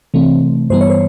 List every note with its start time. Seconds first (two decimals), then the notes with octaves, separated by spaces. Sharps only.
0.14 C3 E3 A3 C4
0.70 G2 E3 G3 B3 C5
0.81 C#5
0.90 C5